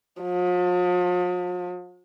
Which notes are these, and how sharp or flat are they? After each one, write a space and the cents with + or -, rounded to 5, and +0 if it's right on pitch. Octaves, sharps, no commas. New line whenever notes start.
F3 +45